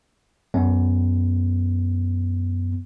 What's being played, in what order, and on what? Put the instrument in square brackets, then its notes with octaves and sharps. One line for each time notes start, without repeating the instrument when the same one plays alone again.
[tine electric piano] F#2 B3